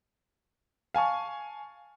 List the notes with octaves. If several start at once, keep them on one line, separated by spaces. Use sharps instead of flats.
F5 G#5 A5 C#6